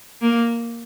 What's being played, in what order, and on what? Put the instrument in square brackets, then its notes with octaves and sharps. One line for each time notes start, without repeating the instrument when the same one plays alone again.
[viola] A#3